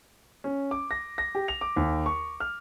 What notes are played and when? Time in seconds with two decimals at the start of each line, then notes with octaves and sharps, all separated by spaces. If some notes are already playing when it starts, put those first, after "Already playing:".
0.44 C#4
0.71 D6
0.91 A#6
1.18 A#6
1.35 G4
1.48 F7
1.61 D6
1.76 D#2
2.06 C#6
2.40 F6